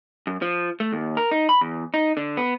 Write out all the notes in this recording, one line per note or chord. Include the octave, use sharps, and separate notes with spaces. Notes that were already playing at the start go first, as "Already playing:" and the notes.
F#2
F3
A3
D#2
A#4
D#4
B5
E2
D#4
D3
B3